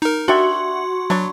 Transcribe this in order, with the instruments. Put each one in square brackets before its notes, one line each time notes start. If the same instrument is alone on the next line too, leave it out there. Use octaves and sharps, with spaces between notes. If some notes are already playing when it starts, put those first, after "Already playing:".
[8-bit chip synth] D#4 A#4
[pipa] D4 G4 E5 [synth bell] F#4 [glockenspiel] C6 C#6 G#6
[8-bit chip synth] F#3 [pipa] D4 B5 C#6